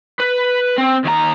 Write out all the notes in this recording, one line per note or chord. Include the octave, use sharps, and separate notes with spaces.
B4
C4
D#2 A#5